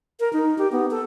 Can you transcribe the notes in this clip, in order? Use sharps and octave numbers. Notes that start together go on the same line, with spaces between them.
A#4
D#4
G4
B3
A4